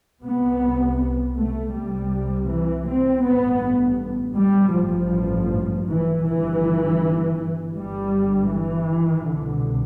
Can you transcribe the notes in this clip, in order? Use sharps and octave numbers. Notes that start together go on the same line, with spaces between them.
C2 C3 B3
A3
C2 C3 G3
E3
C4
A1 G2 B3
G3
A1 G2 F3
E3
G1 G2 E3
G1 G2 G3
E3
C2 B2 D3